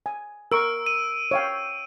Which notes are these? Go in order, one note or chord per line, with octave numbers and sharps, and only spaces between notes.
G#5
A#4 C#6 E6 D7
D#7
C#5 F5 G5